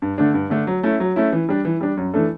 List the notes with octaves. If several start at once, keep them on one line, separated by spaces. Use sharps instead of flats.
G2
D3 A3 D4
G2
D3 A3 D4
F#3
A3 C#4 E4
F#3
A3 C#4 E4
E3
G3 D4
E3
G3 D4
F#2
E3 A3 D4 A4